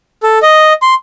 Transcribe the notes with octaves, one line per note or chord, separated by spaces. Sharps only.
A4
D#5
C6